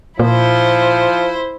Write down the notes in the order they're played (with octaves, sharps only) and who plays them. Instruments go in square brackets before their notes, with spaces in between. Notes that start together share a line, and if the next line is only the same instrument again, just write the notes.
[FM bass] A#2 [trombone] F3 [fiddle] E4 C5